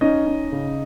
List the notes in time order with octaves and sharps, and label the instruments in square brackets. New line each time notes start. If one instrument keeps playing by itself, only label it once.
[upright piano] C#4 [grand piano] D#4 D#5
[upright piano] C#4
C#3